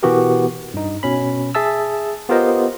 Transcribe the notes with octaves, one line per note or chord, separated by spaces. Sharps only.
B2 E3 B3 F#4 G4 A#4
G2 D#4
B2 C#4 B5
G#4 E5 A5 E6
B3 F4 G4 A#4 C5 D#5